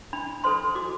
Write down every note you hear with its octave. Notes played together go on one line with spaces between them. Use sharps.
D4 B5
A4 C5 C6
F#4 D6